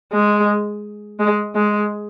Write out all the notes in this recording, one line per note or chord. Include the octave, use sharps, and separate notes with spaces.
G#3
G#3
G#3